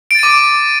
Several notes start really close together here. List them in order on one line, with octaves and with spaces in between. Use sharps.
D7 A6 D#7 D6